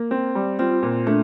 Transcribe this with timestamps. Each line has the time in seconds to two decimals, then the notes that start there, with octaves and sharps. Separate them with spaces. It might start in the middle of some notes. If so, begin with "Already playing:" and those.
Already playing: A#3
0.11 C4
0.35 G3
0.59 C4 F4
0.83 A#2
1.07 A3 D4